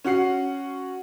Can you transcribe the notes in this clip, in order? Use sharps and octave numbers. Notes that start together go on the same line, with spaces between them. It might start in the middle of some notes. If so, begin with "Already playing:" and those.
C#4 F#4 F#5 C7